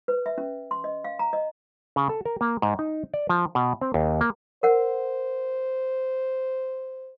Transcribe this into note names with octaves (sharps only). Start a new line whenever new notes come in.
B4
E5
C#4
C6
D#5
F5
A#5
D#5
C#3
A4
A#4
A#3
G#2
D#4
D5
F3
B2
C4
D#2
A#3
A#4 C5 F#5